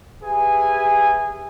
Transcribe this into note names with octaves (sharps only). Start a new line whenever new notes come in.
G4 G#4 B4 E5 G#5